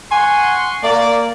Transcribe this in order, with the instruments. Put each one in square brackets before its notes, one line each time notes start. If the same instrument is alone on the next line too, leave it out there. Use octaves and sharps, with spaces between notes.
[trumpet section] F#5 C6 C#6 [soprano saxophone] G#5
[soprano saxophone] A#3 [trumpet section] D5